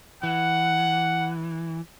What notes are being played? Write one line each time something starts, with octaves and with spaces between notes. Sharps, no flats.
E3 F#5